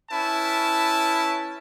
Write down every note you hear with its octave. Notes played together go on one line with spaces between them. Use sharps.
C#4 E4 B4 A5